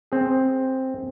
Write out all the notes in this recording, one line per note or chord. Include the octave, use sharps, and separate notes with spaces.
C4 G#4